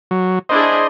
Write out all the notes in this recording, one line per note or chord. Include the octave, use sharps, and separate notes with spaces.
F#3
D4 E4 G#4 C5 D#5